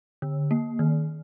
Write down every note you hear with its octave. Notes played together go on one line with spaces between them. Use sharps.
D3
A#3
D#3